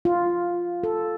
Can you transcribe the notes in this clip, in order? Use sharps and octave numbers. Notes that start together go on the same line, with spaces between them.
F4
A4